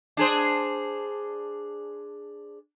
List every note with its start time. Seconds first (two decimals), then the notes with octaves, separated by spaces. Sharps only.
0.17 D4 G#4 C5